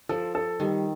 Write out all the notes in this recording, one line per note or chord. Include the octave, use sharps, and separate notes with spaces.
F3 A4
A4
D#3 G3